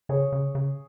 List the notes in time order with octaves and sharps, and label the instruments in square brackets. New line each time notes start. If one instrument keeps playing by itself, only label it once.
[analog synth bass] C#3 [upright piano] G#4 C#5
[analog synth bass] C#3
C#3